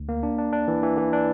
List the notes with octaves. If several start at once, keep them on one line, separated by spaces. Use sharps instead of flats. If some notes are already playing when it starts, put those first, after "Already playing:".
Already playing: D2
A#3
D4
D4
D4
E3
E3
E3
D4